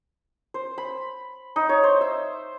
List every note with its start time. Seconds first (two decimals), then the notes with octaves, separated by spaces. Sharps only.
0.54 C5
0.78 B5
1.56 D#4
1.69 C#5
1.84 C5
2.01 E5